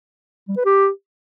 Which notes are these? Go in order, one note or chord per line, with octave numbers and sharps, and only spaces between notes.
G3
B4
G4